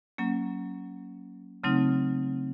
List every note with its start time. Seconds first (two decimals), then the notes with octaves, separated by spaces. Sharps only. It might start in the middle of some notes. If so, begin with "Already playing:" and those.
0.18 F#3 A#3 C#4
1.64 C#3 F#3 A3 C4 D#4